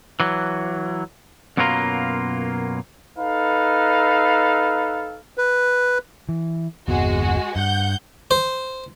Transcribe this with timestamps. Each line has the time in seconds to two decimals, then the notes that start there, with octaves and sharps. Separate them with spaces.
0.20 E3 F#3
1.57 F#2 B2 F#3 A#3 F4 A#4
3.18 D#4 A4 B4 F5
5.38 B4
6.29 E3
6.88 G1 E2 G#3 B3 F#4
7.56 G2 F#5 G6
8.31 C5